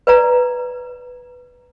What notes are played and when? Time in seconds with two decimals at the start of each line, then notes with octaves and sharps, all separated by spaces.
0.07 B4 D5 A#5